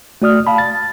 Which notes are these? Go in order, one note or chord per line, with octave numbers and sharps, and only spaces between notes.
A3 F#4 D5 D#6 F6
F5 A5 B5
A6